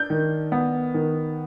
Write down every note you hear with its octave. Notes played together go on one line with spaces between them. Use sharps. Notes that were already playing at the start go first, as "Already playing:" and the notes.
Already playing: D4 G6
D#3
B3
D#3